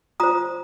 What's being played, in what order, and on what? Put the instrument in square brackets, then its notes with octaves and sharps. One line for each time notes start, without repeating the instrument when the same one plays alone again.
[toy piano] F4 C5 A#5 D#6